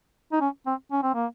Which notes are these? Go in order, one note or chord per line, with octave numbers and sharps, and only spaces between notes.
D#4
C#4
C4
C#4
C4
A#3